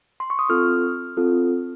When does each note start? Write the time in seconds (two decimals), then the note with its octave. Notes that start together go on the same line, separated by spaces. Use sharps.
0.20 C6
0.30 C#6
0.39 D#6
0.49 C4 F4 A4 F6
1.17 C4 F4 A4